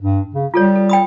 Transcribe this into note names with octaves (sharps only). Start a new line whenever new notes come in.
G2
C#3
G3 F4 A4 C#5
A4
G5 B5 D#6